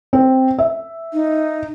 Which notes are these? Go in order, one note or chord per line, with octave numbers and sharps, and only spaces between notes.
C4
E5
D#4